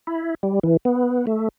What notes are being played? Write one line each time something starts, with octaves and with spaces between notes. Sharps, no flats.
E4
G3
E3
B3
A3